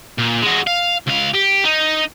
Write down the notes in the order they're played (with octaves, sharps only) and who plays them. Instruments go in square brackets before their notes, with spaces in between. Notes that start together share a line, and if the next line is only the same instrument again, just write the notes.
[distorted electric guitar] A#2
G#3 F#4
F5
C#2 F5
G4
D#4